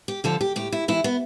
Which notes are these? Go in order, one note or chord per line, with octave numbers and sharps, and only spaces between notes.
G4
D3 F3 A4
G4
A2 G4
E4
E3 E4
B3